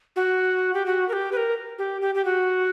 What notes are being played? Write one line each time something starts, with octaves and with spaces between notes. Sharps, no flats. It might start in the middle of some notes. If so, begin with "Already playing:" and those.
F#4
G4
F#4
A#4
G4
B4
A#4
G4
G4
G4
F#4